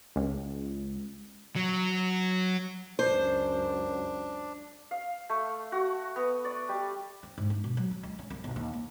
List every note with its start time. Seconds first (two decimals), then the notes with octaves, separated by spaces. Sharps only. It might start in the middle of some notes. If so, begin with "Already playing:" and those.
0.16 C#2
1.55 F#3
2.99 C#2 F#2 D4 C5
4.91 F5
5.29 A3
5.72 F#4
6.16 B3
6.45 D5
6.69 G3
7.23 C4
7.38 G#2
7.50 D#4
7.64 B2
7.77 F#3
7.91 C#4
8.03 C#2
8.19 C#4
8.30 C2
8.44 B1
8.56 D#2
8.73 A#3